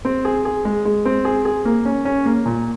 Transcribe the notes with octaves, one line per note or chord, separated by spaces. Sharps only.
C4
G#4
G#4
G#3
G#3
C4
G#4
G#4
A#3
C#4
C#4
A#3
A#2